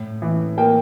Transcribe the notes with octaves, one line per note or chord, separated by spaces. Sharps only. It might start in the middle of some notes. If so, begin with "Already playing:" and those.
Already playing: A2
E3
A#3 G5